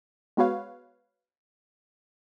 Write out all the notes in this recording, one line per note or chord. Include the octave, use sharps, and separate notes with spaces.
G#3 B3 F#4 B4 C#5 F5